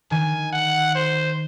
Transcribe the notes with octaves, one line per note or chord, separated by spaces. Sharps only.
D#3 G#5
F#5
C5